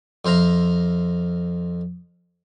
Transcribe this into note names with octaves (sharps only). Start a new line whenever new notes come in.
F2 C5 E5 F5 A#5